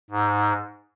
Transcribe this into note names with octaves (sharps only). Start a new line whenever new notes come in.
G#2